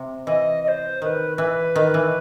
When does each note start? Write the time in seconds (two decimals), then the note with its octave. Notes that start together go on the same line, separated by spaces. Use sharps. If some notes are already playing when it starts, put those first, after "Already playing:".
Already playing: C3
0.27 E3 D#5
0.64 D#5
0.68 C5
1.01 D#3 B4 C5
1.38 E3 B4
1.76 D#3
1.94 E3